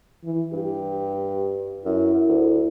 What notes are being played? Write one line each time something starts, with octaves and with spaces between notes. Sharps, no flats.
E3
G2 G4
F#2 E4
D2